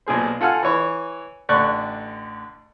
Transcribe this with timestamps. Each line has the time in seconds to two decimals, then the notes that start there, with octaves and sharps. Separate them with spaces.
0.06 B1 A#2 G#4 C5
0.41 F4 A4 F#5 G#5 F6
0.63 E3 C#5
1.49 A1 D3 D5 C#6 F#6